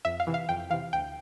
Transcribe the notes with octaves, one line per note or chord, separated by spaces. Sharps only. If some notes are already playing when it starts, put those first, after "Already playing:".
F2 E5
F5
C3 E3
F5
F2 G5
C3 E3 F5
D2 G5